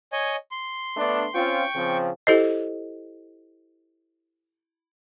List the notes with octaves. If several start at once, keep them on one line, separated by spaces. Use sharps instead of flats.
C#5 D#5 G#5
C6
A3 B3 D4
C4 C#4 F4 G5 C#6
C#3 F3 C4
E4 G4 A4 C5 D#5